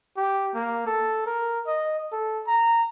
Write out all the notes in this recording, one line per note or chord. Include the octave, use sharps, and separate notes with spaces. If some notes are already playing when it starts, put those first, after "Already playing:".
G4
A#3
A4
A#4
D#5
A4
A#5